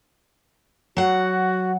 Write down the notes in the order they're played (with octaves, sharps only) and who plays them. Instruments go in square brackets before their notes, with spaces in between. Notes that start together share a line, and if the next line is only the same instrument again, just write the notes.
[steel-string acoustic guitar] F#3 F#5 [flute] F#4